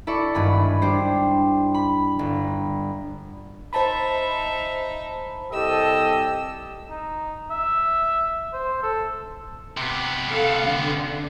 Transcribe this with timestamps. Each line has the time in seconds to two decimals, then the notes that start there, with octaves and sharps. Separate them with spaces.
0.07 E4 A4 D5 C#6
0.35 G#1 G2 G#4 B5
0.82 G3 D4 G4 C5
1.74 B5
2.19 G1
3.73 D#4 C5 E5 A5 B5
5.52 C2 G4 A4 D#5 E6
6.90 D#4
7.51 E5
8.53 C5
8.83 A4
9.77 C3 B3
10.31 A4 F5
10.63 D3